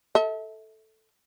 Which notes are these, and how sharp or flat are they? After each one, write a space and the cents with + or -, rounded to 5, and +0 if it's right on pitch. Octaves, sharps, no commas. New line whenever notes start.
A4 +0 E5 -40